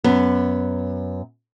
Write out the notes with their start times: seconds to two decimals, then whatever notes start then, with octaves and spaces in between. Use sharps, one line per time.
0.04 F#2 B3